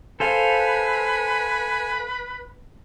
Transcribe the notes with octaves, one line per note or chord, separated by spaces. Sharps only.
A4 B4 C5 F5 G#5